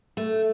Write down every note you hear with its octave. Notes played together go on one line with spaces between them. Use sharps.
A3